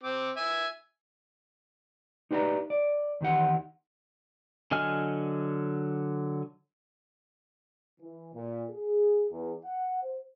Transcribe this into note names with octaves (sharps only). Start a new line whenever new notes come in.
C4 D6
E5 G#5
D#4 G4 B4 D5 F5 A#5
D5
E2 D#3 G4 F#5
D3 F#3 D#5 G#5 F6
E3
A#2
G#4
E2
F#5
C5